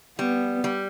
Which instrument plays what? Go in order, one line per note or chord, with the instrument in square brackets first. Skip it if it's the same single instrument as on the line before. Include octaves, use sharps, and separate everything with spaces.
[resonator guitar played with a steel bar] G3 [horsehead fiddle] B3
[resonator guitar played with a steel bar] G3